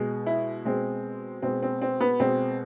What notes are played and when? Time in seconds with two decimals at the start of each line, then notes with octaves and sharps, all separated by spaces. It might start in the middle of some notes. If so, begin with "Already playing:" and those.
Already playing: B2 G#3
0.27 E4
0.65 B2 G#3 C4
1.42 B2 G#3 C4
1.63 C4
1.82 C4
2.01 B3
2.20 B2 G#3 C4